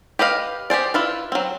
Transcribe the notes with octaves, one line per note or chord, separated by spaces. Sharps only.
G4 B4 D#5 F5
G4 G#4 C5 D5
E4 F4 B4
F#3 C4